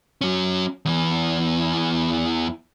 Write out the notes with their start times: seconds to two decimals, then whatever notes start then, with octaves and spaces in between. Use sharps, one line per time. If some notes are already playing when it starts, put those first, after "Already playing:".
0.21 F#3 C#4
0.85 E2 E3